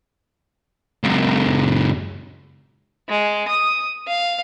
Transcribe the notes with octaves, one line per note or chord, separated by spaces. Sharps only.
C#2 F#2
G#3
D#6
F5